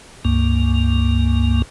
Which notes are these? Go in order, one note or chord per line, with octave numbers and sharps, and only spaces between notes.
C#2 G2 A#3